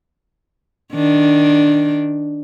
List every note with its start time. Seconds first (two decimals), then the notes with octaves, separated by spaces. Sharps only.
0.94 D#3 D4